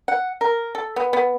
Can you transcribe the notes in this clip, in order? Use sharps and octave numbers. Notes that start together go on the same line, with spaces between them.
F#5
A#4
A4
B3
B3